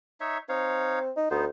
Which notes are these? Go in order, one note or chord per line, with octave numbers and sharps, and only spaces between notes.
D#4 C#5 E5
C4 D#4 C#5 F5
D#4
D2 B3 D#4 C5